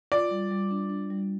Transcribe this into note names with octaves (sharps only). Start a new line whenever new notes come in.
F4 D5
G3
G3
D4
D4
G3